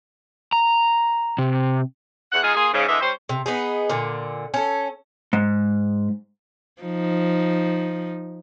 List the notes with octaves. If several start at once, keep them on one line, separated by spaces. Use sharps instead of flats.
A#5
C3
E2 F#5
G#3 D#4 F4 G#4
A#3 F4 G#4
G#2 C#3
D3 E3 G#3 D#5 E5
G3 C#4 C5
C3
B3 D#4 G#4
A#2 D3
C#4 A4
G#2
F3 D#4